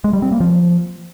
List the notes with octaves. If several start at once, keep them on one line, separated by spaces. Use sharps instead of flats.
G#3
G3
C4
A#3
F3